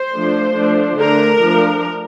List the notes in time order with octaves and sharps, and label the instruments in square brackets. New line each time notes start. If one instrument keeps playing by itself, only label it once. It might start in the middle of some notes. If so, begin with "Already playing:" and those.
Already playing: [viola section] C5
F3 A3 D4
F3 A3 D4
D3 A3 D4 A#4
F3 A3 D4